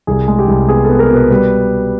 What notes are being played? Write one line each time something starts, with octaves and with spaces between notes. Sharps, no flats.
C2 G#4
G#3
G4
C2
B3 G#4
B3 A4
A#4
B2 B4
G3 B4